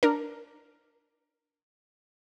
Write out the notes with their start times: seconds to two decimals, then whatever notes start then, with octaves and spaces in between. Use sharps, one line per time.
0.03 D4 A#4